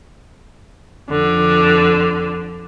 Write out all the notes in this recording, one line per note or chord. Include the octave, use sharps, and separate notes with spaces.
F2 D3